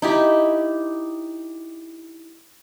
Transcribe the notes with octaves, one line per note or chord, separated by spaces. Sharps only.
D#4 E4 G4